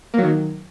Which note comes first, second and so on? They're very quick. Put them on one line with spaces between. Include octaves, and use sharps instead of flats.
A#3 F#3 D#3